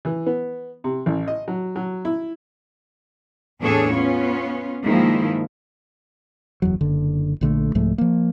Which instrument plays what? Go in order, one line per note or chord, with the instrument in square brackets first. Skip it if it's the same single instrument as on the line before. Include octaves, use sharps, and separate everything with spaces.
[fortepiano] E3
B3
C3
A1
D#5
F#3
F#3
E4
[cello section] E2 A2 D4 G#4 A4 C#5
B3 C#4 F4
G2 D#3 F3 G#3 A#3 E4
[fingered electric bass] F#1 E2 F#3
F#1 D3
A#1 D3 F3 A3
C2 G#2 F3 A3
F3 A#3